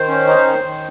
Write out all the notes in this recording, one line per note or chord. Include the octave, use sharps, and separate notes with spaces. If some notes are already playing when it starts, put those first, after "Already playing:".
Already playing: D#3 C5
C#4
D#4
D#3
D#3